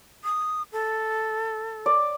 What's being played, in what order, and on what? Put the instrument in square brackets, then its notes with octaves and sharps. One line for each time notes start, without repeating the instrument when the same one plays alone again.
[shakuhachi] D#6
A4
[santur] D5